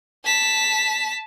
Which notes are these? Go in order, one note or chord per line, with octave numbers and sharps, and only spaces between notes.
A5 B6